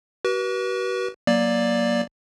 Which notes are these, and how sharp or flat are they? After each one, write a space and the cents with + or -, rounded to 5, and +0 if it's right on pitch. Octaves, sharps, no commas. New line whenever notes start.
F#4 +40 B4 -35
F#3 +10 A#3 +20 D5 +0